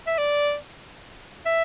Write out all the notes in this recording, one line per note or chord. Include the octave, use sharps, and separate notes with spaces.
E5
D5
E5